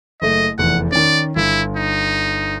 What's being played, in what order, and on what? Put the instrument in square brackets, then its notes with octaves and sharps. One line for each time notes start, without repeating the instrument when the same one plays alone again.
[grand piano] F#1 A3 [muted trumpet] D#5
[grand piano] F1 E2 [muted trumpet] F#5
[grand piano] D#3 C#4 [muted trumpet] D5
[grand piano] G1 [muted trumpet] E4
[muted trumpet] D#4